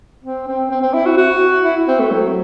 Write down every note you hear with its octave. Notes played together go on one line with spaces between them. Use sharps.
C4
C4
C4
C4
E4
F#4
F#4
E4
C4
A3
F#3